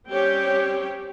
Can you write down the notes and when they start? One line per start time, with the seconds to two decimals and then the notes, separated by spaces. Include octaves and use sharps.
0.11 G3 C4 C#4 G4 C#5 G5